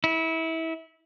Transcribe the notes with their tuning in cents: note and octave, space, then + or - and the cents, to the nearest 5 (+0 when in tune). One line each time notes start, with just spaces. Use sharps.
E4 -25